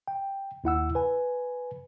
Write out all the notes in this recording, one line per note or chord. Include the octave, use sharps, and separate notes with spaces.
G5
D#2 E4 F#5 E6
B4 G#5